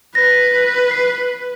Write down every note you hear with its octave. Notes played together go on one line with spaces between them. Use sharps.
B4 A#6
F#6 C7